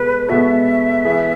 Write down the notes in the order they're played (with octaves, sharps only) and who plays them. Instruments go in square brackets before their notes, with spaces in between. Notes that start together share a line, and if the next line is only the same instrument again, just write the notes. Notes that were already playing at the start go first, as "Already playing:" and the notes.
Already playing: [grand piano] B2 G#3 B3 A4 [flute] B4
[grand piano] B2 G#3 B3 F#4 A4 [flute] E5
[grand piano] E3 B3 E4 G#4